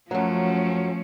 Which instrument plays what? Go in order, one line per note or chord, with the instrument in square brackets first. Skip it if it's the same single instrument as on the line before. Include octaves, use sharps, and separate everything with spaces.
[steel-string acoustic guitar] F#2 F#3 [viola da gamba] F3 [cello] A3 C#4